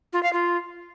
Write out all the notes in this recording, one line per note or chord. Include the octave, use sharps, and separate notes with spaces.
F4
F5
F4